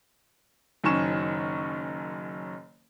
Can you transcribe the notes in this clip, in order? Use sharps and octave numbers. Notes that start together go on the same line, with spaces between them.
F#1 F#2 D#3 C#4 C#6 E7